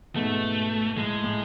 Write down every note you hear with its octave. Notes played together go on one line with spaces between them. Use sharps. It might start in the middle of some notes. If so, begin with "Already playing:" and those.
G#2 B2 A3
A2 G#3
A2